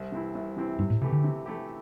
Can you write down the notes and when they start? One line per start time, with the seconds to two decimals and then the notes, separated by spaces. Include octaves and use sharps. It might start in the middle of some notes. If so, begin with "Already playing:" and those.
Already playing: C2
0.12 C3 E3 C4 E4
0.35 C2
0.56 C3 E3 C4 E4
0.79 G2 C3
0.90 A2
1.01 C3 E3 A3 E4 G4
1.12 D3
1.24 C3
1.46 E3 A3 E4 G4